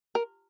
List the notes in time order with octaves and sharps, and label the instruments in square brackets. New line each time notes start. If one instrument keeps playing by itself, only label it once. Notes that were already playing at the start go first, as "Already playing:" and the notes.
[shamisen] A#4